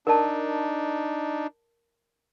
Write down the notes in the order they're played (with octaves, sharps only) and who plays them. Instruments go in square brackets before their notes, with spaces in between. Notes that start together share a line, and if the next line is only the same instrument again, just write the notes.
[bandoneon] D4 D#4 [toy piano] A#4 D5 A5